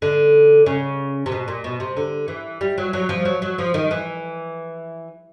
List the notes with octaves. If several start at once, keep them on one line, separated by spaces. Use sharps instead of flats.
D3
C#3
C3
B2
A#2
B2
C3
D3
E3
G3
F#3
F#3
F3
F#3
F#3
F3
D#3
E3